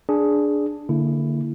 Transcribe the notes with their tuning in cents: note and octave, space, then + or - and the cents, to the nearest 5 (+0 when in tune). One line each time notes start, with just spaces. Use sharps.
D4 +0 G#4 +5
D3 +0 A#3 -20 E4 +10